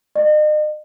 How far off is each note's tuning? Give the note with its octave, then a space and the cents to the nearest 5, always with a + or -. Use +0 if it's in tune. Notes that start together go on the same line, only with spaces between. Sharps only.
D#5 -40